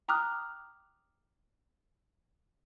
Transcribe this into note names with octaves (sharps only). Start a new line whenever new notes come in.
G5 A#5 D6 D#6 F6 F#6